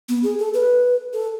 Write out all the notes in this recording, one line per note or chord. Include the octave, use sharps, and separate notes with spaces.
B3
G#4
A4
B4
A4